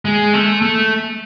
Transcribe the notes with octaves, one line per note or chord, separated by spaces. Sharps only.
G#3
A3
A3